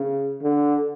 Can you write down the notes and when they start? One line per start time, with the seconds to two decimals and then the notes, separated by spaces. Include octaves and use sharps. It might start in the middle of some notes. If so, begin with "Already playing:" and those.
Already playing: C#3
0.42 D3